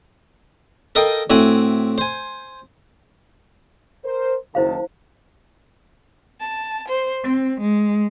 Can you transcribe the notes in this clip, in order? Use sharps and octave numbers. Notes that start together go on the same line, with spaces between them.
A4 A#4 D#5 F5 G5
A2 C4 F#4 E5 G#5 B5
C5 G#5
A#4 C5
F#1 D#3 E4 C5 F5 A5
A5
C5
C4
G#3